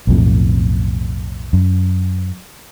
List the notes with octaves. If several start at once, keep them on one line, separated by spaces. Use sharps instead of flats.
B1 F2 A2
F#2